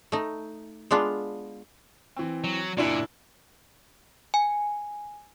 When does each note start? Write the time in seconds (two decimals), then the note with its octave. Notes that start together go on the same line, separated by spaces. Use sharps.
0.12 A3 D#4
0.91 G#3 B3 D4 F4
2.16 E3 C4
2.44 F#3
2.77 F#1 A#2 D4 E4
4.34 G#5